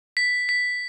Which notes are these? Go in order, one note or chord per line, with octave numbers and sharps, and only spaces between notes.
B6
B6